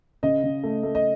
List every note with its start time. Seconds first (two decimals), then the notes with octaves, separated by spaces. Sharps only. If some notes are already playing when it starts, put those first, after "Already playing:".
0.23 C#3 D#5
0.43 C#3
0.63 A3
0.83 A3
0.95 D#5